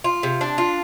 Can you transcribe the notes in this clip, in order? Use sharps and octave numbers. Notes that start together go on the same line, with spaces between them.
F4
C3
D4
F4